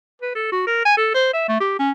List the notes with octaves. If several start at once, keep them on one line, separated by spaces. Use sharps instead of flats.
B4
A4
F#4
A#4
G#5
A4
C5
E5
A3
G4
C#4